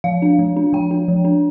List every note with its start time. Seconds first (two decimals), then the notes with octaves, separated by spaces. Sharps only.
0.04 F3 F5
0.22 D4
0.39 F3
0.56 D4
0.73 F3 G5
0.91 D4
1.08 F3
1.25 D4